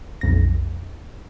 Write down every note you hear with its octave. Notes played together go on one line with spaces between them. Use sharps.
B1 F2 A#6